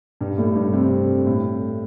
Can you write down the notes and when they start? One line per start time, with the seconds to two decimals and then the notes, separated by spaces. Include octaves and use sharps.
0.21 G2 G3
0.38 A2 A3
0.55 G2 G3
0.73 C3 C4
1.27 A2